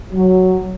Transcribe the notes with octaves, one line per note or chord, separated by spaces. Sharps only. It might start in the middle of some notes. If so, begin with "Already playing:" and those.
F#3